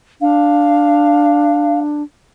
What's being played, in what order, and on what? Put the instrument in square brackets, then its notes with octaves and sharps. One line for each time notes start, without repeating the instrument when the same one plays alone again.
[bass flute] D4 [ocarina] F5